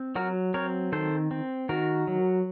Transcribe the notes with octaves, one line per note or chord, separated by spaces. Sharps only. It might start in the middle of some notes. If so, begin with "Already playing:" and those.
Already playing: C4
F#3 F#4 A#4
C4 A#4 C#5
D#3 A4 C5
C4
D#3 F#4 A#4
F#3